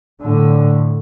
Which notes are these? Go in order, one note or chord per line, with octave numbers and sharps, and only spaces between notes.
A2 D3